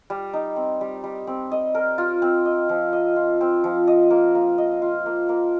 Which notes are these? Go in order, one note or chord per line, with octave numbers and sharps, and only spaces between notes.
G3
D#4
C4
G3
G3
C4
D#5
A#4
F4
C4
D#5
F3
D#5
F4
C4
F3
D#5
A#3
A#3
D#5
F4
A#3
A#3